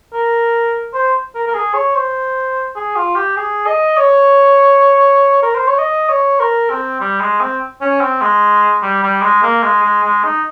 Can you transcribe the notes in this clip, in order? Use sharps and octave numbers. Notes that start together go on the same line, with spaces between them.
A#4
C5
A#4
A#4
G#4
C#5
C5
G#4
F4
G4
G#4
D#5
C#5
A#4
C5
C#5
D#5
C#5
A#4
C4
G3
G#3
C4
C#4
C4
G#3
G3
G3
G#3
A#3
G#3
G#3
G#3
D#4